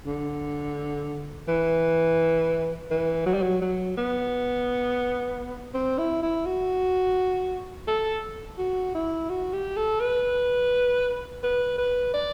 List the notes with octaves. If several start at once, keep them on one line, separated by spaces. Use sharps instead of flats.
D3
E3
E3
F#3
G3
F#3
F#3
B3
C4
E4
E4
F#4
A4
F#4
E4
F#4
G4
A4
B4
B4
B4
D5